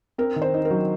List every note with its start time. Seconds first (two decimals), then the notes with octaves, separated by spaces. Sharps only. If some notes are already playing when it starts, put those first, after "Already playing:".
0.18 C4 A#4
0.36 D#3
0.42 C5
0.54 D#4
0.65 A#4
0.70 F#3